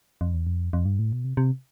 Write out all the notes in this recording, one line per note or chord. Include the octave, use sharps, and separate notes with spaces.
F2
E2
F2
F2
G2
A2
B2
C3
C3